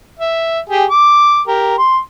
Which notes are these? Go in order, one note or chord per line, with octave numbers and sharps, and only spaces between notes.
E5
G4 G#4
D6
G4 A#4
C6